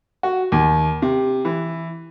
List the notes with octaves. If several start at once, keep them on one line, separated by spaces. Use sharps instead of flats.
F#4
D#2
C3
E3